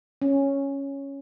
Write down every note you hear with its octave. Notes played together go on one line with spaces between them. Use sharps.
C#4